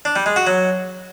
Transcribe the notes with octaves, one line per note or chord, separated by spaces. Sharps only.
D4
G3
G#3
F#4
F#3